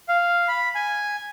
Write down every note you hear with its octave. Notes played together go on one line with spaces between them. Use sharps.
F5
B5
G#5